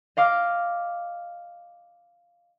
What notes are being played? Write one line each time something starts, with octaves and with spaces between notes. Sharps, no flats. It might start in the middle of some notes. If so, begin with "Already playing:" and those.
D#5 F5 D6 F6